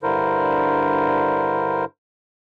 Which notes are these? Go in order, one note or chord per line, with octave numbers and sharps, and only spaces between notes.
G2 D3 E4 A#4 C5